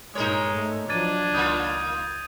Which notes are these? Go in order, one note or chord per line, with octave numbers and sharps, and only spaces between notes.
G2 A#2 G#3 D#4 A#4 C#5
G#2 A3
F3 F#3 D4 G#6 A6 D#7
C#2 D#3 A#3 F4 D#6 G6